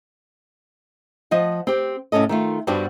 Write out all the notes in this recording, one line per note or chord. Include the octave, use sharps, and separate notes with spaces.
F3 D#5 F#5
C4 G4
A2 C3 C#4 A4 D#5
D#3 A3 F4
G2 G3 B3 C4 D4 F#4